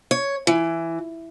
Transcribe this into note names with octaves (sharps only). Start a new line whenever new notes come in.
C#5
E3